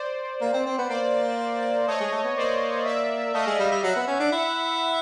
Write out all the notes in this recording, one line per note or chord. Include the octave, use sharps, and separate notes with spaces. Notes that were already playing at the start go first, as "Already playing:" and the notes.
Already playing: C5 D5
A#3
C4
C4
B3
A#3 C5 D5
A3 C#5 D#5
G#3
A3
B3
A#3 C5 D5
D5 E5
A3 D#5 F5
G#3
G3
G3
F#3 E5 F#5
B3
C#4
D4
E4 E5 F#5